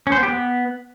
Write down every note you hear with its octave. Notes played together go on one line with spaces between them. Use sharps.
C#4
C5
B3
G4
B3